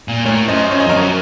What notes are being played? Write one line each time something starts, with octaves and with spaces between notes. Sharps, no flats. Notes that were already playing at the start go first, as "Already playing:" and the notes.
A#2
A2 A#4 C#5
F#2 C5 D#5
F#2 C#5
D#5
F2
F#2 A#4 C#5